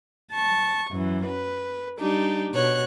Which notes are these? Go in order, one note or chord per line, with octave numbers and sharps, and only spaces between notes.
A5 C#6
F#2 E3
B4
G3 D4 D#4 G4
B2 C#5 F#6